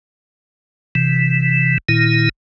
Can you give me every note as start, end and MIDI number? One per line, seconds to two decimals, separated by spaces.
0.95 1.78 48
0.95 1.78 52
1.89 2.29 46
1.89 2.29 51
1.89 2.29 64